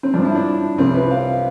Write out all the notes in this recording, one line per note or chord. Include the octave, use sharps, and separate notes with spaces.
C4
G2 F3 D4
E4
D4
C2 C3 F3 C4
B4
F5